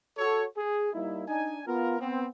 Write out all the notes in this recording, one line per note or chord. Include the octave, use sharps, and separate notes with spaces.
F#4 A4 C#5
G#4
G3 A#3 D#4 E4
D4 D#4 G#5
B3 F4 A#4
B3 C4